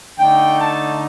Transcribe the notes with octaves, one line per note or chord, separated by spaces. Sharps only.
D3 A3 D#4 G5
A5